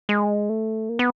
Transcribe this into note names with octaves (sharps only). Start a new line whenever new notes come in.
G#3
A3
A#3
B3